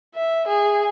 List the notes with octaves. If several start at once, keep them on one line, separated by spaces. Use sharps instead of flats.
E5
G#4